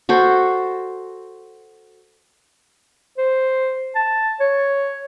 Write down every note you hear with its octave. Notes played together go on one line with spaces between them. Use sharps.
F#4 A4 C5
C5
A5
C#5